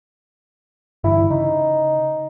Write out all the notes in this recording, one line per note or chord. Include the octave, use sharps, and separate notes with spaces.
G2 D3 E3 E4
C#3 D#4